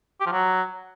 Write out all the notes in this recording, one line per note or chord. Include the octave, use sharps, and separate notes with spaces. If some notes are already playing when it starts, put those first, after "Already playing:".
G4
F3
F#3